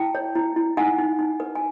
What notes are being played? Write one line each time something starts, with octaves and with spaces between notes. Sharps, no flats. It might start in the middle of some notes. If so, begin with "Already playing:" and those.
Already playing: E4 G5 A5
C#5
E4
E4
D#4 F#5 G#5
D#4
D#4
B4
G#5